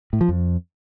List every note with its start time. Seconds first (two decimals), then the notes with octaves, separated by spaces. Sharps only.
0.13 A2
0.21 F3
0.28 F2